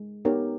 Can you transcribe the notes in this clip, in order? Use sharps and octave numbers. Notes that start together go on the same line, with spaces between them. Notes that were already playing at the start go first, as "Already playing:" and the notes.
Already playing: G#3
B3 D#4 G4 A#4 C#5